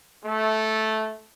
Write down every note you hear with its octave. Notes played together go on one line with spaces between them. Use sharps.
A3